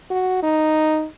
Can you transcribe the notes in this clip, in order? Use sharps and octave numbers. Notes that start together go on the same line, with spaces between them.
F#4
D#4